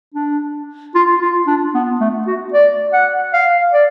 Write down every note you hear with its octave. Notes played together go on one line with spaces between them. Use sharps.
D4
F4
F4
D4
B3
A3
F#4
D5
F#5
F5
D5